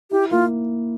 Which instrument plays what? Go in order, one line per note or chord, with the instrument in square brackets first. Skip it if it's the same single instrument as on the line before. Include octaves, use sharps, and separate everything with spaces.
[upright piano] E4 [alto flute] G4
[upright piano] A#3 [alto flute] F4